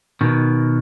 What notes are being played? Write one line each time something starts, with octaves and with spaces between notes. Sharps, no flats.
B2 D#3